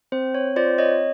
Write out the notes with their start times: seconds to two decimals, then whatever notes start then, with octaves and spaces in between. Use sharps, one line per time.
0.12 C4 C5
0.35 C#5
0.56 F4 C5 D5
0.78 C#5 D#5